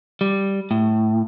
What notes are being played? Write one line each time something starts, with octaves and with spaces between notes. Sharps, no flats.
G3
A2